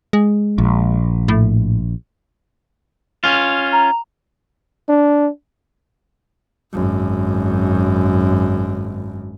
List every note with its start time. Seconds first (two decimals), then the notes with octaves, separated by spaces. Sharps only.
0.13 G#3
0.58 A#1
1.28 A2
3.24 C#4 F4
3.72 A#5
4.89 D4
6.73 G#1 F#2